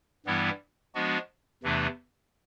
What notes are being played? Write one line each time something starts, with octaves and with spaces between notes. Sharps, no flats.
G2 E3 G3 B3 E4
F3 G#3 B3 D4 F#4
E2 C3 E3 A3 D4